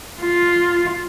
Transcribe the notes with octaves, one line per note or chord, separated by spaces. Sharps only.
F4